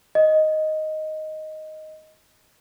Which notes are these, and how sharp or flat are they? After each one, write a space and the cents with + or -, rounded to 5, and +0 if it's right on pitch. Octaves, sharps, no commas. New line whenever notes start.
D#5 +0